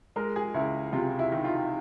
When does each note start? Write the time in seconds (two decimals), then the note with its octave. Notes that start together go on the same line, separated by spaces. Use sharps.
0.16 G#3 A#4
0.36 G#4
0.54 C#2 E4
0.93 C3 F4
1.19 E4
1.32 D#3
1.44 F4